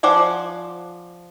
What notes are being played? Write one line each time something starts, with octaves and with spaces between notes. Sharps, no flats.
F3 C5 D5 F#5 G#5